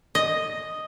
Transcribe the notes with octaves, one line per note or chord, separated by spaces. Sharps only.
D#5